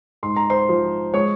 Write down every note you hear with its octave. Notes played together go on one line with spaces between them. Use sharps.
G#2 C6
A#5
C5 C6
F3
G#3 C#5 C#6